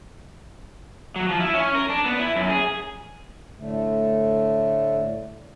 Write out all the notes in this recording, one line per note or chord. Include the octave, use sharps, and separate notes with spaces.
F#3
F3
E4
C#4
A#4
D4
B3
E4
F#2
G#4
A2 D3 A3